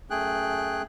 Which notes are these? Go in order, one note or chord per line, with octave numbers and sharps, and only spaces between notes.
F#2 A3 G#4 G5 F#6